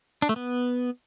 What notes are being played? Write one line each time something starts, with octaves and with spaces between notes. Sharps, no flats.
D4
A3
B3